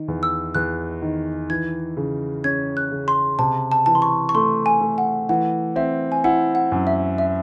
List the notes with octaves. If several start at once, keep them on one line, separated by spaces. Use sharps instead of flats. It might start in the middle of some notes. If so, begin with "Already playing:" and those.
Already playing: D#3
E2
E6
E2 F#6
D#3
E3 G#6
C#3
C#4 G#6
F#6
C#3
C6
C3 A5
A5
E3 A5
C6
C#6
C#6
A3 C6
G#5
A3
F#5
E3 F#5
C4 E5
G#5
E4 F#5
F#5
F#2
E5
E5